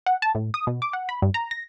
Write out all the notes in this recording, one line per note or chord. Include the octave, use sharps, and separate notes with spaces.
F#5
A5
A2
D#6
B2
D6
F#5
B5
G2
A#5
A#6